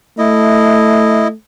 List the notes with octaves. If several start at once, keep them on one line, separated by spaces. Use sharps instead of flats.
A3 E4 D#5